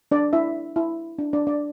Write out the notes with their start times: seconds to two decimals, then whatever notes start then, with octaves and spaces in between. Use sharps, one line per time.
0.11 D4 D5
0.33 E4 E5
0.76 E4
1.19 D4
1.33 D4 D5
1.47 D4 D5